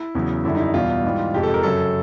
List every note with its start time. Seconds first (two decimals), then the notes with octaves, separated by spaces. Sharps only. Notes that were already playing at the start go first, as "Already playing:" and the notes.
Already playing: E4
0.15 E2 C#3 F#3
0.44 F#2 D3 G3 E4
0.55 D#4
0.59 E4
0.74 E2 B2 G3 F4
1.04 G#2 E3 G3
1.34 F2 C3 F3 G#3 G4
1.43 A4
1.54 A#4
1.63 F#2 C#3 F#3 A4